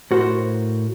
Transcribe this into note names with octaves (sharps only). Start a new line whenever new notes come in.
A2 F#4 A#4 C5